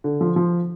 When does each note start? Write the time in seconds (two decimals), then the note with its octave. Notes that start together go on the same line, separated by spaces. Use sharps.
0.04 D3
0.21 F3
0.36 F3